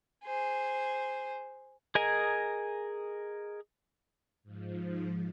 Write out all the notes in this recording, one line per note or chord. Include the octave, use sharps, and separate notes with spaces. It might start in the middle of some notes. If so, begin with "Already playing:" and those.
G#4 C5
G#4 A#4 D#5 G#5 A#5
G#2 F3